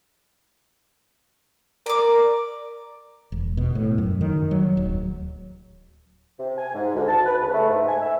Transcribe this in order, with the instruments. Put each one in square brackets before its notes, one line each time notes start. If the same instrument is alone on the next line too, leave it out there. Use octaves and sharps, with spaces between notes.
[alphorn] A#4 [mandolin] D5 D6
[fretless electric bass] E1
B2
A2
F#2
D#3
F#3
D1
[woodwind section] C3
G#5
G#2
D2
A5
B4
C#3
A3
G#2
G#5
E5